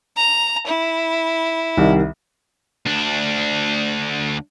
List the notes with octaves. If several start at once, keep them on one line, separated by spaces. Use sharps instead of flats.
A#5
E4
C2 D#3 G3
D2 D4